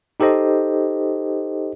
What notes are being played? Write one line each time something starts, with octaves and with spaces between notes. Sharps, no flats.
D#4 G4 A4 C5 D#5